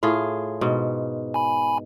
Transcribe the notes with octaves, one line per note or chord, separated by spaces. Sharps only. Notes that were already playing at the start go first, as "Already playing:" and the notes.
A2 F4 G#4
G#2 B2
G#5 B5